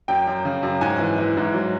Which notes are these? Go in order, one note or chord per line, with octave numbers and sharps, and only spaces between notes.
F#2 G5
F#2
C#3
F#2
G#2 G#5
E3
E3
G#2
F#3